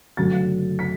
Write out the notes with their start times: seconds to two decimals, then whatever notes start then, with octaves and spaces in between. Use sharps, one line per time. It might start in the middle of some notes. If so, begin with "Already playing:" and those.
0.17 F#1 F#2 D3 F#3 A3 A6
0.79 B6